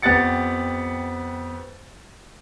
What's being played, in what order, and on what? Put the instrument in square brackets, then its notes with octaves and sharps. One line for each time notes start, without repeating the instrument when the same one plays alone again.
[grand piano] F2 B3 G4 F#5 A6 C#7